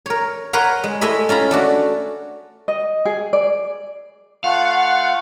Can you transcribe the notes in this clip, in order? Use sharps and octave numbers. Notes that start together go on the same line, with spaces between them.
A#4 C#5
A#4 B4 C#5 F#5 A#5 C6
G#3
G#3 A3 E4 D#5 E5 B5
C#4 F4 A#5 B5
A3 D4 F#4
D#5
G#4
D5
A3 F4 F5 F#5